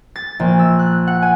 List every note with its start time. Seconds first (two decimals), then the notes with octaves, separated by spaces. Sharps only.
0.16 A6
0.40 A#1
0.59 E6
0.79 F#6
1.07 F#5
1.22 G#5